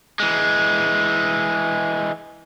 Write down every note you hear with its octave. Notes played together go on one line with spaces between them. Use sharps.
E3 G#3